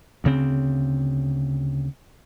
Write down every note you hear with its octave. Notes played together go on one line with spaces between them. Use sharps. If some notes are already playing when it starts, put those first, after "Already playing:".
D2 C#3 C4